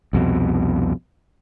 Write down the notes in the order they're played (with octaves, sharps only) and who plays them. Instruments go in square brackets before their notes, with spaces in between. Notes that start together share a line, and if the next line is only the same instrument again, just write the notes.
[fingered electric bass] C2 F2 B2